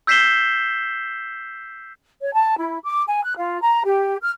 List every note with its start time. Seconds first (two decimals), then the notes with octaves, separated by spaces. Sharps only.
0.07 E6 G6 B6 C7 E7 G7
2.21 C#5
2.33 A5
2.56 E4
2.83 D6
3.07 G#5
3.24 F#6
3.37 F4
3.61 A#5
3.85 G4
4.20 F6